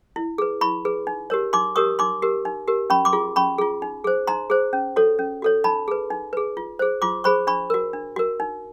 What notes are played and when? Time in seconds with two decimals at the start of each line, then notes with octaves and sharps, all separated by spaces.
0.16 E4
0.38 G#4 B4
0.61 E4 B5 C#6
0.85 G#4 B4
1.07 D#4
1.30 G4 A#4 C#5
1.53 D#4 C6 D6
1.76 G4 A#4 C#5 C#6 D#6
1.99 D#4 C6 D6
2.22 G4 A#4
2.45 D#4
2.68 G4 A#4
2.90 C#4 B5 C#6
3.05 C6 D6
3.13 F4 G#4
3.36 C#4 B5 C#6
3.58 F4 G#4
3.82 D#4
4.04 G#4 C5
4.27 D#4 A#5 C6
4.50 G#4 C5
4.73 C#4
4.96 F#4 A4 C#5
5.19 C#4
5.42 F#4 A4 C#5
5.64 D#4 A5 B5
5.88 G#4 B4
6.10 D#4
6.33 G#4 B4
6.57 F4
6.79 G#4 C5
7.02 F4 C6 D6
7.24 G#4 C5 B5 C#6
7.47 D4 B5 C#6
7.70 F#4 A#4
7.93 D4
8.16 F#4 A#4
8.40 D#4